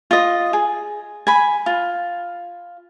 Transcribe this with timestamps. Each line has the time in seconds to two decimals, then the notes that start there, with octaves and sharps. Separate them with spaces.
0.11 F4 D#5
0.53 G#4
1.27 G#5 B5
1.66 F4